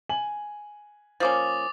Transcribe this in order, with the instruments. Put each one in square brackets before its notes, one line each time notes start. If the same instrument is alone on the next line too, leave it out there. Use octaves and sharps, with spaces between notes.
[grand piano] G#5 F#7
[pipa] F3 A#3 C#4 [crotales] D6 D#6 A6